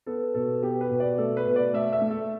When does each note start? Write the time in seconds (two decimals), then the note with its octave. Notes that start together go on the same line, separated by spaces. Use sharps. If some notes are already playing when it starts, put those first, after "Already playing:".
0.06 B3 A4
0.34 B2 A4
0.62 B3 G4
0.81 B4
0.90 B2
1.00 D5
1.18 A3 A4
1.37 B4
1.46 B2
1.56 D5
1.73 A3 E5
1.92 E5
2.01 A3
2.10 A4